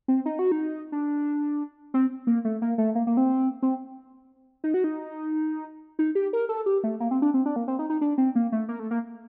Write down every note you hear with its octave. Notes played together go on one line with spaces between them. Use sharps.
C4
D#4
F#4
D#4
D4
C4
A#3
A3
A#3
A3
A#3
A#3
C4
C4
D#4
F#4
D#4
D#4
G4
A#4
A4
G4
A3
A#3
C4
D4
C4
D4
A#3
C4
D#4
D#4
D4
C4
A#3
A3
A#3
A3
A#3